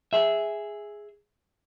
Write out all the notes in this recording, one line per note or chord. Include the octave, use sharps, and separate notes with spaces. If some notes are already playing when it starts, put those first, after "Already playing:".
G#4 E5